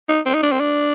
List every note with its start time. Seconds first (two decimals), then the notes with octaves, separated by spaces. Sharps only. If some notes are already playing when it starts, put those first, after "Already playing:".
0.09 D#4
0.26 C4
0.34 D#4
0.43 D4
0.52 C4
0.60 D4